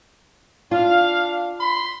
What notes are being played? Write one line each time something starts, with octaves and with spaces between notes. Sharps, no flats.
D4 F4 F5
B5 C6